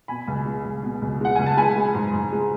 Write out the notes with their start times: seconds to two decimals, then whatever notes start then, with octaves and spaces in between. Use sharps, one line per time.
0.08 B2 G#5 B5
0.28 C#2
0.46 G#3
0.65 C#2
0.83 B2
1.02 C#2
1.21 G#3 F#5
1.35 C#2 G#5
1.46 A5
1.57 G#3 G#5 B5
1.76 G#3
1.94 G#2
2.14 G#2
2.32 G#3